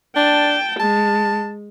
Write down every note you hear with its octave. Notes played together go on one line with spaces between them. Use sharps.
D4 G5 A5
G#3 A5